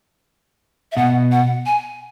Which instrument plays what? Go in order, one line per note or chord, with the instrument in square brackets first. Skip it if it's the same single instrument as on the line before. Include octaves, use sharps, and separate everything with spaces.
[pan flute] E5
[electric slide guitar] B2 [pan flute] F#5
[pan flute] F#5
G#5